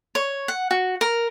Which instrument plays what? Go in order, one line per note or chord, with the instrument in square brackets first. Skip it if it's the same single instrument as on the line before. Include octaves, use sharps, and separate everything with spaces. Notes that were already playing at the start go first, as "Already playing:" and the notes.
[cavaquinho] C#5
F#5
F#4
A#4